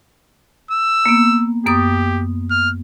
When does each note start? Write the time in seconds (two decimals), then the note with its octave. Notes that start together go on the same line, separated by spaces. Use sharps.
0.71 E6
1.06 A#3 B3
1.66 F#2 B3 G4 D#6
2.50 F6